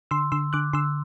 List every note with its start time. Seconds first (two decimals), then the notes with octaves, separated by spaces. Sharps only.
0.11 D3 C6 E6
0.32 D3 C6 E6
0.53 D3 D6 F#6
0.73 D3 C6 E6